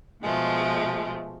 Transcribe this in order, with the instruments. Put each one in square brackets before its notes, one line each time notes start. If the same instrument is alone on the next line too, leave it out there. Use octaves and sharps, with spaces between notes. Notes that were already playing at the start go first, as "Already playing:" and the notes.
[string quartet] B2 F3 G#3 A3